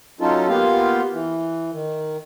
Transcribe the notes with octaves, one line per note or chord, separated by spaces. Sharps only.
F#3 C#4 D#4 F4 A4
A#3 B3 F4 G4 F5
E3
D#3